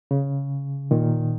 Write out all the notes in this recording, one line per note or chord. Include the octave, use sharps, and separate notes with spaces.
C#3
A#2 D#3